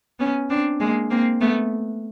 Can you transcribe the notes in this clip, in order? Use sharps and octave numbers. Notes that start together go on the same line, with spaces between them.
B3 C#4
C4 D4
G#3 A#3
A#3 C4
A3 B3